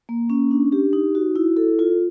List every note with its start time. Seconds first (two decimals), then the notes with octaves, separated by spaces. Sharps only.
0.09 A#3
0.30 C#4
0.51 D4
0.72 G4
0.93 D#4
1.15 F#4
1.36 E4
1.57 A4
1.79 F4